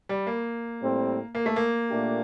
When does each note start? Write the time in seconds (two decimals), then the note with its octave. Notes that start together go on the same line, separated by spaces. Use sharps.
0.09 G3
0.27 A#3
0.81 A2 G3 C4
1.35 A#3
1.46 A3
1.56 A#3
1.89 A#2 A3 D4 G4